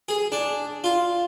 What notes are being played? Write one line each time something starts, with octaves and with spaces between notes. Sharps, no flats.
G#4
D4
F4